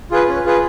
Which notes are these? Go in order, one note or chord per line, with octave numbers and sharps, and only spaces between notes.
F4 G#4 B4
C#4
F4 G#4 B4